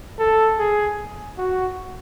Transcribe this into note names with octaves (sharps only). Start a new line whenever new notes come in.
A4
G#4
F#4